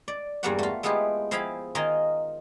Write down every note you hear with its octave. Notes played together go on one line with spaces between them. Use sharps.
D5
E2 G2 G3 A#3 F#4 F#5
A3 F4
G#3 A3 B3 E4 F4 G4
F3 E4 G#4 F5 G5 B5
D#3 D#4 F4 A#4 D#5 G#5